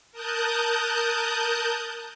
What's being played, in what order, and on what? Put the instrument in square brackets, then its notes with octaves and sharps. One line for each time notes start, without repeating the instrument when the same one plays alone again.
[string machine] A#4 A5 D#6 F#6 G6